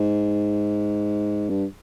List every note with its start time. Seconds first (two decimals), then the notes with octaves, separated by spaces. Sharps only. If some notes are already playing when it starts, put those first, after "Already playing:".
Already playing: G#2
1.50 G2